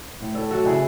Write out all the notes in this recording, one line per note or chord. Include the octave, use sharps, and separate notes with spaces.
A2
A2 A4 C#5
F#3 F#4 A4
C#3 E4 G#4